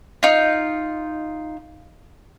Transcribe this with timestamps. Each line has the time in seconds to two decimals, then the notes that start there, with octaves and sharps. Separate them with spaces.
0.23 D#4 F4